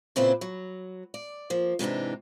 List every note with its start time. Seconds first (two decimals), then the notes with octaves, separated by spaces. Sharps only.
0.16 A#2 C#3 C4 E4 B4 C5
0.41 F#3
1.14 D5
1.50 F3 A#3
1.79 G#2 C3 E3 D4 D#4